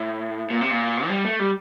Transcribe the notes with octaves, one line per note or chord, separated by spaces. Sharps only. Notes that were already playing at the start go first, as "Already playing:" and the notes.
Already playing: A2
A#2
C3
A#2
F3
G3
A3
G3